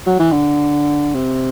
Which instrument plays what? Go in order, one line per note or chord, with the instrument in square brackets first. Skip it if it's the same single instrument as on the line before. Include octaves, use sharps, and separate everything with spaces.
[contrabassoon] F#3
E3
D3
C3